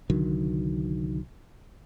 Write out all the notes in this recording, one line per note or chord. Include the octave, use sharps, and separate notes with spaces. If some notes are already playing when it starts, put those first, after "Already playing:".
C2 D3 D#3 F#3